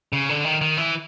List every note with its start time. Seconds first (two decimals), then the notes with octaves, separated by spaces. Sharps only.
0.13 C#3
0.29 D3
0.45 D#3
0.61 D#3
0.77 E3